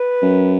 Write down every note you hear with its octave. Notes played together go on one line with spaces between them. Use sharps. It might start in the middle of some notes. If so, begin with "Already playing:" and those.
Already playing: B4
F#2